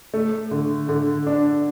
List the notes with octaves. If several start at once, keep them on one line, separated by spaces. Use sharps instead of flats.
A3
D3
D3
D4